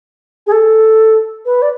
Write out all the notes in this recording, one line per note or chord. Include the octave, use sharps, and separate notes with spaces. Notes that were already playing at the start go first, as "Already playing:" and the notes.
G#4
A4
B4
D5